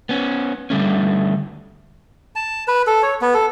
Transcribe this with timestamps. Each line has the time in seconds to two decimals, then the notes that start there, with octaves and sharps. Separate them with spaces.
0.09 B3 C#4
0.70 D3 G3 A3 C#4
2.36 A5
2.68 B4
2.87 A4
3.03 C#5
3.22 B3
3.34 A4